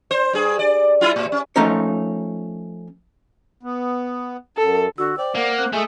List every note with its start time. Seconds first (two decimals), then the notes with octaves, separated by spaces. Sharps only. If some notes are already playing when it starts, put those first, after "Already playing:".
0.11 C5
0.33 G2 G#4
0.59 D5
1.01 G3 E4 F4
1.16 A2
1.32 C#4
1.56 F3 A3 C#4 D#4 A#4 C#5
3.63 B3
4.57 F#2 A4
4.98 D3 F#4 E6
5.18 C5 D5 G5
5.35 A#3 F#5
5.58 C4 F#6
5.73 G#3 A3 G#5 D#6